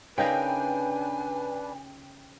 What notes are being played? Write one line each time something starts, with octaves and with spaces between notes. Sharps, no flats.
C#3 D4 D#4 A#4 B4 G5 G#5